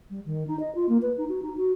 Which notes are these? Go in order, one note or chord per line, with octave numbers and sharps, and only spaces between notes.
G3
D#3
D#4
D#5
F4
A#3
B4
D#4
F#4
D#4
F#4